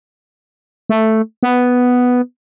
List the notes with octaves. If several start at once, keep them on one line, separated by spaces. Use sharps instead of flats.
A3
B3